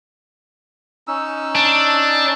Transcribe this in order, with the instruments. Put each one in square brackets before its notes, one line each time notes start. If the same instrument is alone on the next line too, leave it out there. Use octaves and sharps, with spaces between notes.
[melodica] C#4 D#4 E6
[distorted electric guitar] D4